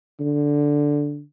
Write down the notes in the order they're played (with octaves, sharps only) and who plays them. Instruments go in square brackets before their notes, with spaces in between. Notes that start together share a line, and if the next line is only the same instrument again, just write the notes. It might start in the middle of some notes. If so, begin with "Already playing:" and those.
[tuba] D3